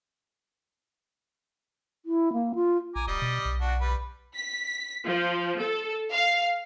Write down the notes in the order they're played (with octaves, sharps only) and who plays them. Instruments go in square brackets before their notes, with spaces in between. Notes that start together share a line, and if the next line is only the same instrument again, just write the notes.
[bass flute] E4
A#3
F4
[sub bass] A#1 [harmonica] G#5 A#5 D6
[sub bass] E1 [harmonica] G3 D5 D#5
[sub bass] B2
B1
[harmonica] D4 F#4
G3 B4
[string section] B6
F3
A4
F5